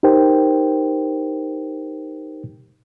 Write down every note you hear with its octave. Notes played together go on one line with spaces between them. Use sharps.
D#4 G4 A#4 C5 G5